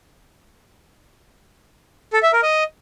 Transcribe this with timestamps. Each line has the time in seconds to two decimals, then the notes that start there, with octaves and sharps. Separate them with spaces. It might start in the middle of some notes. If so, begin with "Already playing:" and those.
2.13 A4
2.23 E5
2.33 A#4
2.43 D#5